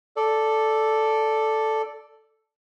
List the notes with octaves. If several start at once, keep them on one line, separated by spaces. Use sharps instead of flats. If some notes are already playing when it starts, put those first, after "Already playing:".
A4 D5